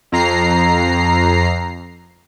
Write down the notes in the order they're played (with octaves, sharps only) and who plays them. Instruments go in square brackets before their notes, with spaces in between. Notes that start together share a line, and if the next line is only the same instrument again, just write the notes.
[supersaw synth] F2 A#5 C7